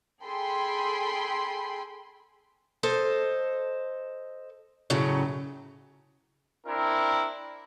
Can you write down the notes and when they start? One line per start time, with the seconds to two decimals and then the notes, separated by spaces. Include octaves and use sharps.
0.24 G#4 A4 G5 B5 C6
2.83 A4 C5 D#5
4.90 F#2 A2 C#3 F#3
6.67 C4 D4 E4 A#4